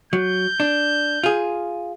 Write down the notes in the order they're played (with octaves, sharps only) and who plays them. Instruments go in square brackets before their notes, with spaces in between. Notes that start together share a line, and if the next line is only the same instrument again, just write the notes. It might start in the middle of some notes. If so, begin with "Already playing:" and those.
[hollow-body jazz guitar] F#3 [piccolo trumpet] G6
[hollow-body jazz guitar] D4
F4 G#4